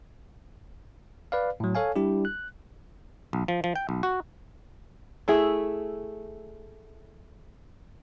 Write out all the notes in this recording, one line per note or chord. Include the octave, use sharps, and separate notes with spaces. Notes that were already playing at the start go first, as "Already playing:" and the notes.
B4 D5 F5
A2 F#3
A4 C#5 F5 G#5
G3 D4 E4 G4
F#6
B1
F3
F3
G5
B1
F#4
A3 E4 G#4